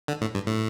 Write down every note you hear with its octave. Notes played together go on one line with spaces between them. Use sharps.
D3
A2
G2
A2